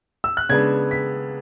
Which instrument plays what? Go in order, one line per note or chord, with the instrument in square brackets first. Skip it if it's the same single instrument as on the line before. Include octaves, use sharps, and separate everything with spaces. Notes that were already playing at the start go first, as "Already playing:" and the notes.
[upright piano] E6
F#6
C#3 G#3 B3 D4 G#6
B6